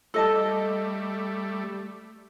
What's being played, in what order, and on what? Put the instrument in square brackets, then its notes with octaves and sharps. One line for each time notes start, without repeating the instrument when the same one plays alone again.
[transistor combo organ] G3 A3 [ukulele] A4 D#5 A5